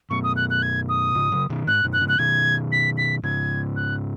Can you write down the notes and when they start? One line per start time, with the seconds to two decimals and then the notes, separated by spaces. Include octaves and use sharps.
0.10 F#2 B2 C#6
0.23 D#6
0.36 F#6
0.50 F#6
0.62 G#6
0.89 D#6
1.15 G#2 C#3
1.32 C#3 F#3
1.50 B2 D#3
1.67 G#2 F#6
1.84 F#2 B2
1.93 F#6
2.01 G#2 C#3
2.08 F#6
2.18 B2 D#3 G#6
2.72 B6
2.97 B6
3.23 G#2 C#3 G#6
3.76 F#6